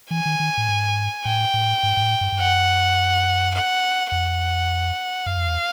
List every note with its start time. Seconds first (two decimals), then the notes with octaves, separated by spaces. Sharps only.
0.11 E3 G#5
0.26 D#3
0.40 D#3
0.57 A2
0.68 G#2
1.25 A2 G5
1.54 A2
1.83 G#2
1.97 G#2
2.02 A2
2.21 G2
2.32 G2
2.39 F#2 F#5
3.54 F#5
4.11 F2 F#5
5.26 F#2 F5
5.37 F2
5.47 E2